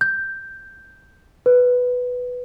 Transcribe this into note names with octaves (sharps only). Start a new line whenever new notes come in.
G6
B4